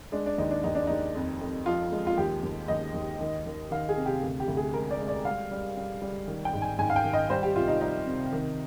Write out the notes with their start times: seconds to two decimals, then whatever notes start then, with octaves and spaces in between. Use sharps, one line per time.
0.12 G#3 D4
0.26 D4
0.38 D#2 D#4
0.51 D4
0.64 D#2 D#4
0.75 D4
0.87 D#2 D#4
1.15 F2
1.41 F2
1.66 F3 F4
1.92 G#3
2.07 F4
2.17 D#2 G4
2.43 D#2
2.68 D#2 D#5
2.94 D#2
3.20 D#3
3.46 D#3
3.71 D#3 F5
3.89 G#4
3.97 C3
4.06 G4
4.22 D2
4.40 G4
4.48 D2
4.57 G#4
4.74 G#3 A#4
4.91 D5
5.00 G#3
5.08 D5
5.25 G3 F5
5.51 G3
5.77 G3
6.02 G3
6.28 D#3
6.45 G5
6.53 G#2
6.62 G#5
6.78 G#2 G#5
6.90 F5
6.96 G5
7.04 D#3
7.13 D#5
7.30 G3 C5
7.43 G4
7.56 C2 F4
7.68 D#4
7.81 G3 D#4
8.07 C3
8.32 D#3